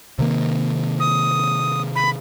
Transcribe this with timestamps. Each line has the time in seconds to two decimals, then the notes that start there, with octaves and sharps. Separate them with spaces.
0.19 C3 D#3 A#3
1.00 D#6
1.95 B5